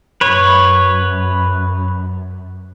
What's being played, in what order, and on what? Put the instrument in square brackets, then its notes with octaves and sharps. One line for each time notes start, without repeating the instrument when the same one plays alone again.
[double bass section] F#2 [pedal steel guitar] B4 C#5